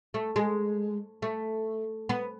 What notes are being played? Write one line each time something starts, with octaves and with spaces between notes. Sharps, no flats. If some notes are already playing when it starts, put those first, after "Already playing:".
A3
G#3
A3
B3